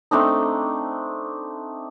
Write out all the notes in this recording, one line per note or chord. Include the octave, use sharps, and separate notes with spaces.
A3 C4 D4 D#4